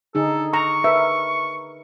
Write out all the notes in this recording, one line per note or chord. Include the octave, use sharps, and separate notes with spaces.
D3 D#4 G#4 A4
A#5 C#6
A#4 B4 E5